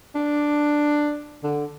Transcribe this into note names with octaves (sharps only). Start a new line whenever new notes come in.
D4
D3